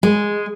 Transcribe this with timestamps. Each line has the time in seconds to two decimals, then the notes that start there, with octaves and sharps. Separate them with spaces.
0.03 G#3